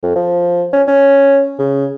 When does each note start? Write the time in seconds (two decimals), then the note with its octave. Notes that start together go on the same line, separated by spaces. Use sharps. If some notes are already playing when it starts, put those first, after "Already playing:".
0.03 F2
0.16 F3
0.73 C#4
0.87 C#4
1.59 C#3